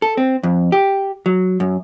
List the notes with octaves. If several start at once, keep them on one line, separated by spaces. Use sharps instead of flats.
A4
C4
F2
G4
F#3
F#2